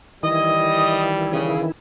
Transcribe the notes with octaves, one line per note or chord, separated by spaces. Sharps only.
D#3 E3 G3 E4 D#5
C#3